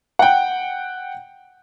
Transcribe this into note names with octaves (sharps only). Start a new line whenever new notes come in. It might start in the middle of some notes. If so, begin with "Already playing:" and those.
F#5 G5